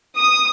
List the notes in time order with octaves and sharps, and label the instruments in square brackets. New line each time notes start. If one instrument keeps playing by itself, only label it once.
[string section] D#6